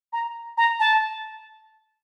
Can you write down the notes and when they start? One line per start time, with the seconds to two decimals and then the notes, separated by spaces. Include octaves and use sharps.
0.13 A#5
0.57 A#5
0.80 A5